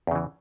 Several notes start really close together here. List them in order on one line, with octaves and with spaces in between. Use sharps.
E2 C#3 E3